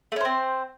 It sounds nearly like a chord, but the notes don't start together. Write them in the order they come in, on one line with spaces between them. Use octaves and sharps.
A3 C#4 C5 C4